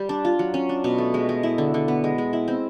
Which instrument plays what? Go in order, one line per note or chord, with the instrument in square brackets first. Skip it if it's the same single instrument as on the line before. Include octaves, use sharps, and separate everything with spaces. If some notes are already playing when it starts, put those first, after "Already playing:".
Already playing: [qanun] G3
D4
F4
F#3
C#4
D4
B2
A3
G#3
G#3
E4
D3
D3
B3
G#3
G#3
E4
C4